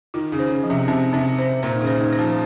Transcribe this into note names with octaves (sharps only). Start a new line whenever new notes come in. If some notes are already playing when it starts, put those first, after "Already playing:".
D#3 F4
C#3
C5
C#3
F3
C3
C3 C4
C3 C4
C5
A#2 C5
D#3
C#3
C5
D#3
C5
F3